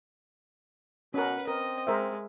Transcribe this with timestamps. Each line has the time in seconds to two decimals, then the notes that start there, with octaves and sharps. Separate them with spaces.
1.14 B2 C#4 A#4 B4 F#5
1.47 C4 A#4 D#5
1.87 G#3 A#4 C5 E5